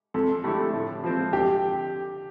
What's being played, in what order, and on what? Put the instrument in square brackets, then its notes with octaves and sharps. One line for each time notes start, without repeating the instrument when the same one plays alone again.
[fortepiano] F2 [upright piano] A4
[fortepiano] D3 A3 E4 G4
A2
F3 C4
[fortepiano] D3 [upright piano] G4